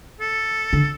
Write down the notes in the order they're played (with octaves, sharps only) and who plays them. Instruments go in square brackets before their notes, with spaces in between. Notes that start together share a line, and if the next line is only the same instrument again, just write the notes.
[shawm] A4
[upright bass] D3